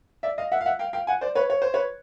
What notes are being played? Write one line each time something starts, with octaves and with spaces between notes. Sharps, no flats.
D5 E5
D#5 F5
E5 F#5
F5
E5 F#5
F5 G5
F5 G5
F#5 G#5
C5 D5
B4 C#5
C#5
C5
B4 C#5